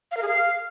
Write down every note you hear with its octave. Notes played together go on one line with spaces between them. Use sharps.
F5
A#4
G#4
F5